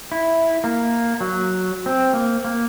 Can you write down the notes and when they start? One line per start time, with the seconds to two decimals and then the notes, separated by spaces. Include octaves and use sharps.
0.12 E4
0.64 A#3
1.21 F#3
1.86 C4
2.14 A#3
2.45 A#3